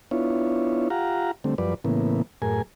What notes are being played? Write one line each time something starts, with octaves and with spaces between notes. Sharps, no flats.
B3 D4 E4 F4 C#5
F4 G4 F5 F#5 A#5
D3 G3 A3 C4
F#2 F3 G3 B4 D5
A2 C#3 E3 A#3 B3
F#2 A2 G#4 A#4 G#5